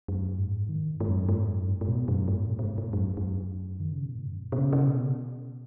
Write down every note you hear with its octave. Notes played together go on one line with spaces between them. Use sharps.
F#2
G#2
D#3
G#2
F#2
G#2
F#2
G#2
G#2
B2
F#2
G#2
B2
B2
G#2
G#2
F#2
F#2
D#3
C#3
B2
G#2
F#2
B2
B2
C#3
C#3
B2